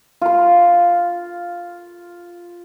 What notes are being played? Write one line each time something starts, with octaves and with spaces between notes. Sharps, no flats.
F4 C6